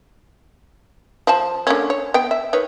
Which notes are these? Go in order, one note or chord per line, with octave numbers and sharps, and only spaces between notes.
F3 A5
D3 A#3 C#4
C#5
B3 G5
E5
D#3 B4 C#5